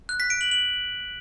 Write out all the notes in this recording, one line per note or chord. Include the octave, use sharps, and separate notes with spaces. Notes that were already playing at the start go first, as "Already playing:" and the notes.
F#6
B6
D7
F#7
F#7